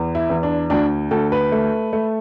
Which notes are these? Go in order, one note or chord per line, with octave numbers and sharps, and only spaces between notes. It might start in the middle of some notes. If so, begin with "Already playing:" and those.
Already playing: E2
E4
E2
D4
D2 D4
D2 A4
B4
A3
A3